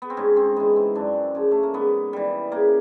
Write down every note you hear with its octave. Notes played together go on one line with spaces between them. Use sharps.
B3
C4
G#2 C#4
C4
E3 G#3 B3
C4
F#2 D4
C#3 F3
A3
A#3
G#2 B3
E3 G3
C#3 A#3